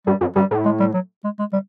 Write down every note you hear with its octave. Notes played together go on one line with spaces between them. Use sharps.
G2 G3
F#2
G2 G3
A2
G#3
G3
F#3
G#3
G#3
G3